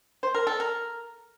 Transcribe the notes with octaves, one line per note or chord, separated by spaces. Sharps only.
C5
A#4
A4
A#4